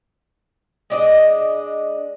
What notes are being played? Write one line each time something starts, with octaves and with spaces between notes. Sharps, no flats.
G#3 D4 D#5